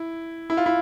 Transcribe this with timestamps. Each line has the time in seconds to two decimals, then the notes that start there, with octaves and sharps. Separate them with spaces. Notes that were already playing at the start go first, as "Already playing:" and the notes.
Already playing: E4
0.50 E4
0.57 F4
0.66 E4